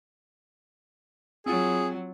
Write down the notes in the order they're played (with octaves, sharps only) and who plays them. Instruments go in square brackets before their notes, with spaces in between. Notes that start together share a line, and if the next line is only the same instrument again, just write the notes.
[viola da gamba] F#3 [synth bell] C4 F4 [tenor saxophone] G#4